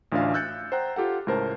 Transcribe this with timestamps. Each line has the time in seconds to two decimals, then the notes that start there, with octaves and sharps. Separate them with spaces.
0.12 A1 D2 D4 F4 E5 F5
0.34 E6 F#6 G6 A6 C#7
0.72 C5 F#5 G5 A#5 F#6
0.96 F4 G4 A4 F#5
1.27 C#2 A2 A#4 C5 A5